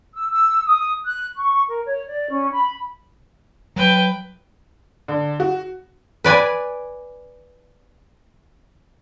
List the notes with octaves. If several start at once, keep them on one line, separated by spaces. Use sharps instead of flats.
E6
E6
D#6
F#6
C#6
A#4
C#5
D5
C#4
B5
F#3 B4 G5
D3
F#4
B4 D5 G#5